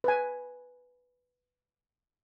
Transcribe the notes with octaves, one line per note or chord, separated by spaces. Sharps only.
B4 G#5